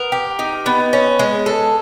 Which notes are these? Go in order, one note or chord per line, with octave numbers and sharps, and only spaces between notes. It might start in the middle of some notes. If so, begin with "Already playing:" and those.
Already playing: B3 A#4
G4
D#4
B3
C#4
G#3
A4